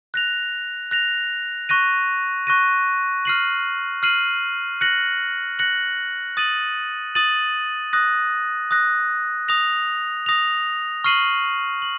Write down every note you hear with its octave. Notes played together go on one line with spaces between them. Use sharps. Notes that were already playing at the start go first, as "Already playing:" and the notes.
F#6 A#6 F7
F#6 A#6 F7
C#6 F#6 A#6 D#7
C#6 F#6 A#6 D#7
F6 C7 D#7 F#7
F6 C7 D#7 F#7
F#6 A#6 C#7 F#7
F#6 A#6 C#7 F#7
D#6 A6 D#7 F#7
D#6 A6 D#7 F#7
D#6 F#6 A#6
D#6 F#6 A#6
D#6 A#6 F7
D#6 A#6 F7
C#6 F6 C7 D#7 F#7
F#7